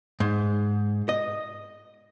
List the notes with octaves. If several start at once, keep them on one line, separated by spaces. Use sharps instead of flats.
G#2
D#5